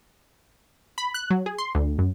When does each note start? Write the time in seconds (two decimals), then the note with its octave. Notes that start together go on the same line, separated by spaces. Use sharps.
0.98 B5
1.14 F#6
1.30 F#3
1.46 G#4
1.58 C6
1.75 D2
1.99 F#2